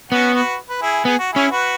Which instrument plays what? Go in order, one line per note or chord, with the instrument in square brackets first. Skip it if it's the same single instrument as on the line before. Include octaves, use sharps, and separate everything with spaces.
[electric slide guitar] B3 [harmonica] C#4 F#4
[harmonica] F#4 B4
B4
E4 G#4
[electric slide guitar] B3 [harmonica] G#4
[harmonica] F#4
[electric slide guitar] C#4 [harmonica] E4 G#4
[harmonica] F#4 B4